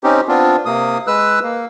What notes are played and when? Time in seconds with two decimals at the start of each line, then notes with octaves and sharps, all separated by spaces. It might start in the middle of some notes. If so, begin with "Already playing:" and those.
0.04 C4 C#4 D#4 G4
0.28 B3 C4 D4 F4
0.66 C3 A#3 D#6
1.07 G#3 B4 E6 F#6
1.43 A#3